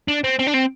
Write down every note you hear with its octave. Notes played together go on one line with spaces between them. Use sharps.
D4
C4
C4
D4
C4